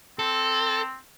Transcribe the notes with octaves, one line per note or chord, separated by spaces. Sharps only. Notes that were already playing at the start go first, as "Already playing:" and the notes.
C4 A4